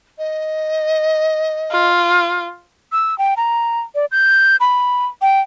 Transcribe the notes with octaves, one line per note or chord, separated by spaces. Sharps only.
D#5
F4
E6
G5
A#5
D5
G6
B5
G5